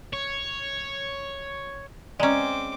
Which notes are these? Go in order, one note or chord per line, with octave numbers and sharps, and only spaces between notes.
C#5
G#3 C4 C#4 D5 A#5 D6